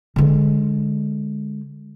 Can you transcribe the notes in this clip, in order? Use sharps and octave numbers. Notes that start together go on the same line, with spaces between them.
D3 G#3